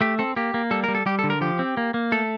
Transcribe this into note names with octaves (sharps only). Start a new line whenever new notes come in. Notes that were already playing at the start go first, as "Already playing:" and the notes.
A3 G4
C4 A4
A#3 G4
A#3
G3 A4
A#4
G3
A4
G3 G4
A4
D3
A#4
F3 G4
C4
A#3
A#3
A3 A4